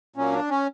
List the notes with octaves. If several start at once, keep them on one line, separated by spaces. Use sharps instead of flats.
A#2 F#3 A#3 C#4
D4
C#4